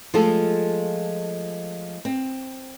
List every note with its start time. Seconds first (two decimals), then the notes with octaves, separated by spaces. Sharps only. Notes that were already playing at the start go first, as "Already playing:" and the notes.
0.14 F3 G#3 A3 F4 G#4 A4
2.05 C4